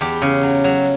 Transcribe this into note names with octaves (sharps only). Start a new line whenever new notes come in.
E2 G4
C#3
F#3
F#3